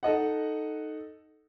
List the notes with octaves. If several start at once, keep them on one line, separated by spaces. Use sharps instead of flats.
D#4 A4 D#5 F#5